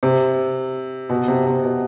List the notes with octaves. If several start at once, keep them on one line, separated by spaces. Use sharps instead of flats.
C3
B2
C3
C3
B2